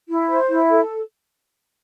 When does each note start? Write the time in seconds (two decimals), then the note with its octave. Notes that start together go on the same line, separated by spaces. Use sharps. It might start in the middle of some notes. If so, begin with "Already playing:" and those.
0.08 E4
0.29 C5
0.49 E4
0.70 A4